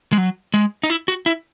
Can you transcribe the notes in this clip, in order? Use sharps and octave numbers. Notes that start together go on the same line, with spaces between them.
G#3
F#3
G#3
D#4
E4
F#4
E4